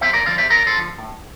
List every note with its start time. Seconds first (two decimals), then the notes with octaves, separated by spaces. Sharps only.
0.01 F2 C5 E5
0.13 A#4 D5
0.26 D3 F3 D5 F5
0.38 C5 E5
0.50 F2 A#4 D5
0.67 A4 C5
0.74 D3 F3
0.98 A2